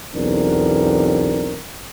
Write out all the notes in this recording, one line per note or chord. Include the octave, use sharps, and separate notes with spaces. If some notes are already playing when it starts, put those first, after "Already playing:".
B1 E2 C4 D4 A#4